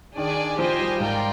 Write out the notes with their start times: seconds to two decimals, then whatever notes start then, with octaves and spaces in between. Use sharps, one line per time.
0.17 D#3 D4 G#4 D5 G#5
0.58 F3 G4 C5 D#5 G#5
0.79 G3
1.00 G#2 F4 A#4 D5 G5